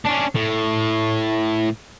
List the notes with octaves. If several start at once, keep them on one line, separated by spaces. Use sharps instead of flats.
C#4 D4
A2